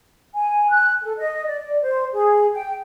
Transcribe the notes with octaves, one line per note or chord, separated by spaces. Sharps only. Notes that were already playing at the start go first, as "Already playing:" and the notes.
G#5
F#6
A4
D#5
D5
C5
G#4
G5